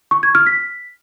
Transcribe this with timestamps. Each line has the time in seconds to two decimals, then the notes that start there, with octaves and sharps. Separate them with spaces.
0.11 C#6
0.23 G#6
0.35 F6
0.47 B6